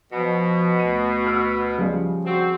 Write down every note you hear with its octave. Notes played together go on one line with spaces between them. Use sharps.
B2 F3
D2 D#7
E6 F6
C#3 F3 G3
C4 F#4